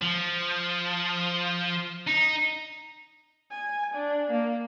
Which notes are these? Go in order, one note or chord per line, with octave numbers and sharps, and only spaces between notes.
F3
D#4
G#5
D4
A#3